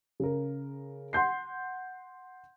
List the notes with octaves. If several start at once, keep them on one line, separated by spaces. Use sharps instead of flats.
C#3 A#4
F#5 C6 G6 C7